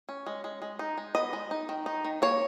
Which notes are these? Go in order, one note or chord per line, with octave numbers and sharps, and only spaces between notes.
C#4
G#3
G#3
G#3
D#4
G#3
B3 D#5
G#3
D#4
D#3
D#4
D#3
A#3 C#5